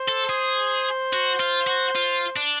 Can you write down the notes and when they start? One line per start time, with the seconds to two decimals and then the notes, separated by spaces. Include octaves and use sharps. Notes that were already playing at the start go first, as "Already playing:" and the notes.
Already playing: C5
0.09 A4
0.29 G#4
1.13 F#4
1.40 F4
1.67 F#4
1.95 F4
2.36 D4